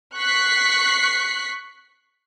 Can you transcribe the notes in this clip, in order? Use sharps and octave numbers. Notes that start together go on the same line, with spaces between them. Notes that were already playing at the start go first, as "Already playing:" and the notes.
C#6 F#6 B6 C7